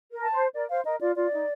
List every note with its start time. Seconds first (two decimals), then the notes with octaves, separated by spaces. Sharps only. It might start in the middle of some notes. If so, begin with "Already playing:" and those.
0.12 A#4
0.23 A5
0.34 C5
0.54 A#4 D5
0.70 C5 F5
0.85 A#4 D#5
1.01 F4 D5
1.16 F4 D5
1.32 D#4